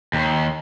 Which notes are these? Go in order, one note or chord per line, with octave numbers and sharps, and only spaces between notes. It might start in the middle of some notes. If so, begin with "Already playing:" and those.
D#2